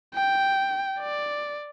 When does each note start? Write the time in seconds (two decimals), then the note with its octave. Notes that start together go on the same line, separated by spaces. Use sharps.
0.14 G5
1.00 D5